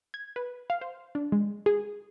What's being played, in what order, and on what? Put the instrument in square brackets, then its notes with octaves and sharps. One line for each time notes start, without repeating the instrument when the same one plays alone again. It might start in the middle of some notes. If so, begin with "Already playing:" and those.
[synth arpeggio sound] G#6
B4
F5
C5
D4
G#3
G#4